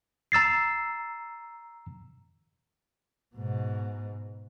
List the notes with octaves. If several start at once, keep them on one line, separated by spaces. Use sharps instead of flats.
A#5 E6 A6 C7
G#2 B2